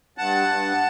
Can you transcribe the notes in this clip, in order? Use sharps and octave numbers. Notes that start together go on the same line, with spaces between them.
G2 F#5 A5
G2